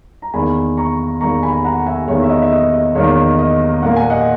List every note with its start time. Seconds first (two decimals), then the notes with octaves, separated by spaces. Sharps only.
0.22 A#5
0.34 E2 D#3 A#3 G#5 B5
0.77 A#5 C#6
1.21 E2 D#3 A#3 A#5 C#6
1.43 G#5 B5
1.64 F#5 A#5
1.86 E5 G#5
2.07 E2 D#3 A#3 C#5 E5
2.23 E5
2.30 D#5
2.42 E5
2.52 D#5
2.73 D#5
2.95 E2 D#3 A#3 C#5
3.38 D#5
3.82 A#2 A#3 F#5
3.96 G#5
4.10 D#5 F#5